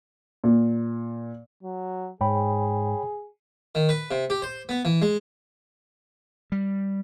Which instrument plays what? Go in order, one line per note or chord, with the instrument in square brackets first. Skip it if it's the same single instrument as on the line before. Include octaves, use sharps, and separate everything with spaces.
[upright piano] A#2
[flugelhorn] F#3
[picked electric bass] G#2 [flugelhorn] G#4 [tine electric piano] C#5 G5 B5
[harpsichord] D#3
B4
C3
G4
C5
B3
E3
G#3
[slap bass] G3